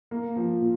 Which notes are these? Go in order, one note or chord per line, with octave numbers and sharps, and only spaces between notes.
A#3
F3
A#2